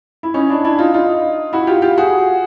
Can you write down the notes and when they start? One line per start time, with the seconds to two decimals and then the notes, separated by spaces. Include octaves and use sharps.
0.23 E4
0.34 C#4 D#4
0.49 D4 E4
0.64 D4 E4
0.79 D#4 F4
0.94 D#4 F4
1.53 E4 F#4
1.67 F4 G4
1.82 F4 G4
1.97 F#4 G#4